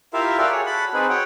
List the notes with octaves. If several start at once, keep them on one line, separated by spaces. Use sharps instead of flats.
E4 F4 G4 A#4 E5 F5
F#4 A4 A#4 D5 F5 G5
G#4 C#5
F#4 A5 B5
C4 D#4 F#4 G#4 B4
C#5 F#5 G5